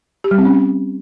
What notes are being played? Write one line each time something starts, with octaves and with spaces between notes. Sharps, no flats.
G4
G3
C4
C#4